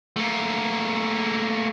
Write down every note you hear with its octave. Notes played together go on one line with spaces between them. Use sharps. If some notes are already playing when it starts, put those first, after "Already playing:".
A3 A#3